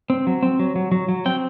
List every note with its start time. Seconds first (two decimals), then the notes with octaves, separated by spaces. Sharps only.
0.10 C4
0.27 F#3
0.43 C4
0.59 F#3
0.76 F#3
0.92 F#3
1.09 F#3
1.26 C4 G5